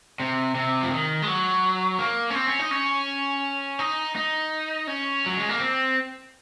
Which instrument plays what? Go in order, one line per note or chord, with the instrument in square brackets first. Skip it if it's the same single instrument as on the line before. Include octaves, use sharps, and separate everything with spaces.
[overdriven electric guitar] C3
C3
F3
D#3
G#3
F#3
A#3
C#4
C4
C#4
D#4
C#4
D#4
D#4
C#4
F#3
G#3
A#3
C4